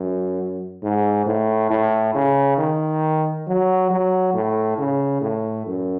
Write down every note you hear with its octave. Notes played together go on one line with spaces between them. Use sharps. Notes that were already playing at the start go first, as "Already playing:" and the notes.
Already playing: F#2
G#2
A2
A2
C#3
D#3
F#3
F#3
A2
C#3
A2
F#2